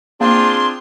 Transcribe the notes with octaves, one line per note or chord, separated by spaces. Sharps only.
A#3 C4 D4 F4 G#4 C6